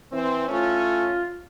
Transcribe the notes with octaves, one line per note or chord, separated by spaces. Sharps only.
E3 C4
A2 A3 C#4 F4